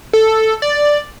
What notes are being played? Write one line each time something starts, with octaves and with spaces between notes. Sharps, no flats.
A4
D5